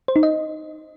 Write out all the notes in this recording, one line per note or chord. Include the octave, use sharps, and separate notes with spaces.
C5
D#4
D#5